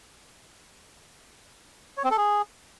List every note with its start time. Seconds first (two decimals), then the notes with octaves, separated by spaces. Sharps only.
1.97 C#5
2.04 C4
2.11 A4
2.18 G#4